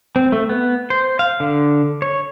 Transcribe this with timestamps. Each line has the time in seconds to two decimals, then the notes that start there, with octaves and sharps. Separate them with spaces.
0.16 C4
0.32 A3
0.49 B3
0.90 C5
1.19 F5
1.40 D3
2.02 C#5